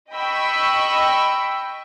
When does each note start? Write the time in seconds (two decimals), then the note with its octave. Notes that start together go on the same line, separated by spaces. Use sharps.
0.12 D#5 G5 B5 C#6 E6